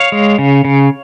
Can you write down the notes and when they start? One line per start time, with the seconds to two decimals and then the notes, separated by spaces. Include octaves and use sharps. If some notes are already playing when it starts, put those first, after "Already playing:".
Already playing: C#5 F5
0.12 G#3
0.39 C#3
0.65 C#3